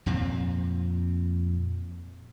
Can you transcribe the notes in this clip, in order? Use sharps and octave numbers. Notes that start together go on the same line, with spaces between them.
F2 A#2 C4